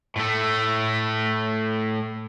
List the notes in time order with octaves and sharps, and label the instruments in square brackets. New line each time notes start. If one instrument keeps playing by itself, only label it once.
[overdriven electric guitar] A2 A3